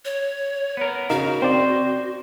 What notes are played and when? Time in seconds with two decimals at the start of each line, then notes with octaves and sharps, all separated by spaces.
0.05 C#5
0.77 B3 A#4
1.10 C#3 D#4 F#4 A#4 F5
1.42 C4 C5 D5